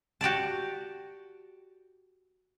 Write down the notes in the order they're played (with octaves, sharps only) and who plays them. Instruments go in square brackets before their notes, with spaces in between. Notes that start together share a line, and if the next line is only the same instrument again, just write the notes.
[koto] F#4 G4 D5 A5